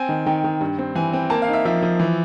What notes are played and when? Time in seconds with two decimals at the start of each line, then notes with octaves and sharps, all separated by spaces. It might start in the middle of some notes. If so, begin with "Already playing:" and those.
Already playing: C4 G#5
0.09 D#3
0.26 D#3 G5
0.44 D#3
0.61 G2
0.78 C4
0.95 E3 G#5
1.13 C4
1.30 A#3 A5
1.42 F5
1.48 D#4
1.53 E5
1.65 F3 E5
1.82 F3
2.00 E3